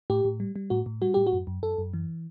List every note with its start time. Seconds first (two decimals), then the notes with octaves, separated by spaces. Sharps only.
0.10 A2 G4
0.25 A2
0.40 G3
0.56 G3
0.70 A2 F#4
0.86 A2
1.02 G3 F#4
1.14 A2 G4
1.27 F#4
1.33 F#2
1.47 F#2
1.63 F#2 A4
1.78 F#2
1.94 E3